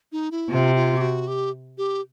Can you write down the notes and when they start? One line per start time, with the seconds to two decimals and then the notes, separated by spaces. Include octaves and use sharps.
0.12 D#4
0.31 E4
0.50 C3 F4
0.75 F4
0.97 G4
1.01 F#4
1.27 G4
1.78 G4